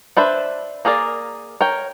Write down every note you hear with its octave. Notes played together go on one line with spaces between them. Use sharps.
D4 B4 C5 E5
A#3 G#4 A#4 D5
A#4 C#5 G5